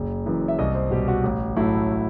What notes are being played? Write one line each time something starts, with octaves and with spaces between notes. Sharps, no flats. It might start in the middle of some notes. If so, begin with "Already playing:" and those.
Already playing: F#1
F#2 E3
E5
C2 D#5
C5
B2 G3 G4
F#4
A1
A2 F#3 A3 E4